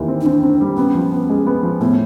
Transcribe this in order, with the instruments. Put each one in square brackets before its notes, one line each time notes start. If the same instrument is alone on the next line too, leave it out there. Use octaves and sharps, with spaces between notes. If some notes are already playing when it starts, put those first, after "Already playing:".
Already playing: [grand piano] D#2 D#3 E3
C4
[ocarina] D#4
[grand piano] C4 [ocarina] D4
[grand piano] C4
G3
[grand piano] B3 [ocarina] C#4
[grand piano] F3
B3
G#3
B3
F3
[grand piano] A2 [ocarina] B3